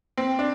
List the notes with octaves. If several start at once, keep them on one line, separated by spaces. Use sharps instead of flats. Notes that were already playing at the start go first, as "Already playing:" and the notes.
C4
D4